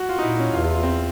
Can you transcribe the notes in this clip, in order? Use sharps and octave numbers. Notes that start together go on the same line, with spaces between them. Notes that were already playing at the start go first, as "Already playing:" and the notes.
Already playing: F#4
F4
D#4
A#2 E4
C#4
E2 F4
F4
F4
C4